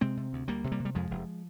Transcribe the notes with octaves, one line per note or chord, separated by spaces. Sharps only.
C3 G#3 C4
C3
D2
D2 G3 A#3
C3
G3 A#3
C3
G3
F2 F3 G#3
F1